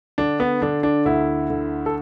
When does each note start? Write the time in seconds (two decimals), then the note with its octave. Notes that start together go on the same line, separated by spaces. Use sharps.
0.18 D3 D4
0.40 B3
0.62 D3 D4
0.83 D4
1.05 D2 E4
1.50 D3
1.86 A4